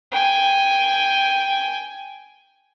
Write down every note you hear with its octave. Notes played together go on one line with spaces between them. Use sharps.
G5 G#5